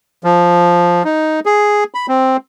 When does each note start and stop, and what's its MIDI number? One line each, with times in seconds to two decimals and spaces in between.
0.24 1.03 53
1.05 1.40 63
1.46 1.84 68
1.94 2.06 83
2.08 2.37 60